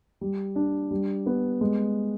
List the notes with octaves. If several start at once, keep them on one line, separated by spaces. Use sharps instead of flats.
G3
D4
G3
B3
G#3